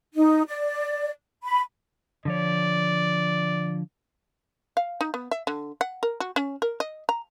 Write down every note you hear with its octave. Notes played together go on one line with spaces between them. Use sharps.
D#4
D5
B5
D3 F3 C#5 D5
F5
D#4
B3
E5
D3
F#5
A#4
F#4
C#4
A#4
D#5
A#5